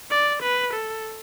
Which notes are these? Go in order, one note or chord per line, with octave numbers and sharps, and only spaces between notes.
D5
B4
A4